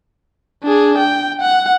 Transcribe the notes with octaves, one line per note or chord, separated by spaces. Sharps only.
D4 G#4
G5
F#5